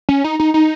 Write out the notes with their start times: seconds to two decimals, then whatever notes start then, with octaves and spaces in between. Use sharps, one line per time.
0.09 C#4
0.24 D#4
0.40 D#4
0.54 D#4